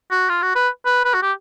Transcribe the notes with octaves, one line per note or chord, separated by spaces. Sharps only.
F#4
F4
F#4
B4
B4
B4
F#4
G4